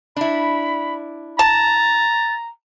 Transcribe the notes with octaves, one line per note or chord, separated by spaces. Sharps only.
D4 E4 B5
A5 A#5 A6